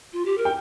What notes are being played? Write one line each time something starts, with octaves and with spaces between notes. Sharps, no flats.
F4
G4
A#4
G5